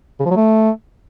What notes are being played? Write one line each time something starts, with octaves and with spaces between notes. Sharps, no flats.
C#3
F3
F#3
A3